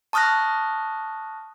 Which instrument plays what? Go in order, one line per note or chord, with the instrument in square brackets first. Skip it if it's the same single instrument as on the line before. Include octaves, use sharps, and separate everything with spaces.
[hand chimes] A5 C#6 D#6 F6 F#6 A#6